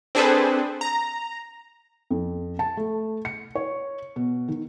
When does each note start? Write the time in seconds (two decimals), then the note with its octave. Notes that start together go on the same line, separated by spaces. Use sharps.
0.15 C4 D4 G#4 A4 B4 C5
0.81 A#5
2.10 F2
2.59 A5
2.77 A3
3.25 C#7
3.55 C#5
4.16 B2
4.48 D#3